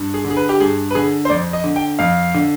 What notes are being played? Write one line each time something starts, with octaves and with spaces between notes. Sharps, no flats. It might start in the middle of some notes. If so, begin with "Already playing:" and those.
Already playing: G2
G#4
D3
G#4
B4
G4
G2 G#4
B4
D3 G#4
C5
F2 D5
D#5
D3
G5
F2 F5
D3